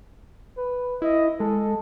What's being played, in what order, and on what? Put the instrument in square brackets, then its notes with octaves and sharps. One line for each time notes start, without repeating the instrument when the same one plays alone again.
[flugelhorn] B4
[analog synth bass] E4 [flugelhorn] D#5
[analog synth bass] G#3 [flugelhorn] A4